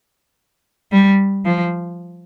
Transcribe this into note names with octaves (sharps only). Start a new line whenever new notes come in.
G3
F3